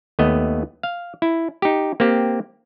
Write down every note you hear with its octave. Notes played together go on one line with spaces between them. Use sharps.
D#2 A3 B3 D#5
F5
E4
D#4 G4
A#3 C4 G4